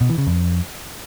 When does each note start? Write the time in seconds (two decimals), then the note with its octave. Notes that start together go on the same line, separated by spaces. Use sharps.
0.01 B2
0.09 E3
0.18 C#3
0.27 F2